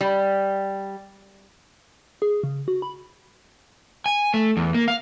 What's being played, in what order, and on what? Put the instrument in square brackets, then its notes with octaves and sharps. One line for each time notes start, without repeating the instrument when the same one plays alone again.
[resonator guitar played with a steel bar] G3
[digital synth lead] G#4
C#3
F#4
B5
[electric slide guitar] G#5
A3
E2
A#3
F5